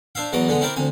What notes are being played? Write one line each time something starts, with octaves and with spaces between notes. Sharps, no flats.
D4 C5 E5 F5
E2 E3 F#3 D#5 D6
D3 G#3 B3
C4 E4 G4 A#4 D5
D2 C3 G#5